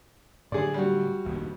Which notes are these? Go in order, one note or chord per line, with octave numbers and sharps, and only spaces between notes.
A2 D3 F#3 G#4 D5
G3 F#4
F1 A#1 D#2